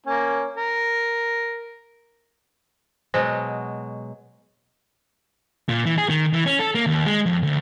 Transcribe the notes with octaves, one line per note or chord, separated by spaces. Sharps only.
A#3 C#4
A#4
B2 F#3 G#3 C5
A#2
E3
G#4
D#3
E3
C#4
A4
A#3
D#2
G#3
F2
D2